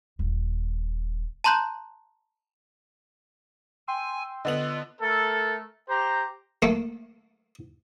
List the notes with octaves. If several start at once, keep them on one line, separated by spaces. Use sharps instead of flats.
D#1
A5 A#5 C6 F#6 G6
G5 G#5 C6 E6
D3 B3 F4 D#5 F#7
A3 A4 A#4
G4 C5 A#5
A3 A#3